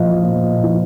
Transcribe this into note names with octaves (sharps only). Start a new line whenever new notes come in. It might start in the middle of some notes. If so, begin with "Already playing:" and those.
Already playing: A#2 F3 D#5 F5
A#2
F3